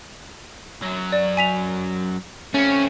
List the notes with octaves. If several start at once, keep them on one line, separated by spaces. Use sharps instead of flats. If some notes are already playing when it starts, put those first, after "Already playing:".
F#2 F#3
D5
G#5 B6 F7
A3 C4 C#4